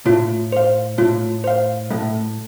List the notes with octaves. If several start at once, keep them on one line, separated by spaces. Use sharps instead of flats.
A2 F4
C5 F5
A2 F4
C5 F5
A2 A3